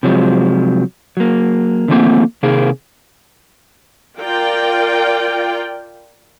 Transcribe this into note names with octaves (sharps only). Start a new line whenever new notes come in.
C3 F3 F#3 G#3
F#3 A#3
D3 D#3 F3 A3 A#3 C4
C3 D#3 A#3 G#4
F4 A#4 D5 G5